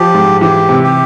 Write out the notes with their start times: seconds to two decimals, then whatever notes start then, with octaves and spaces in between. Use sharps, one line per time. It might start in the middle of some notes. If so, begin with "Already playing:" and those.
Already playing: F3 G4
0.14 G#2
0.41 E3 G4
0.69 C3
0.84 G4